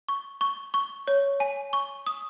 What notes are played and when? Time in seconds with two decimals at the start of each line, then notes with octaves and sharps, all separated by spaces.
0.08 C#6
0.41 C#6
0.74 C#6
1.08 C#5
1.40 G#5
1.73 C#6
2.06 D#6